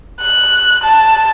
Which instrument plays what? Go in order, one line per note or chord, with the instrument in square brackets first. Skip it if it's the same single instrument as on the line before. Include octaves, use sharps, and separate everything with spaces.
[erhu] F#6
A5